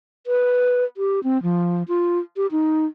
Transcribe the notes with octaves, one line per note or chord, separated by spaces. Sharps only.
B4
G4
C4
F3
F4
G4
D#4